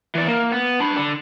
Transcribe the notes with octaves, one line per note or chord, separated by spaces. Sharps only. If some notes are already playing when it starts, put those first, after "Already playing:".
E3 D5
A#3
B3
D4 B5
D3